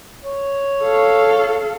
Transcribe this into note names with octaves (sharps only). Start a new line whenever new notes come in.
C#5
A4 F5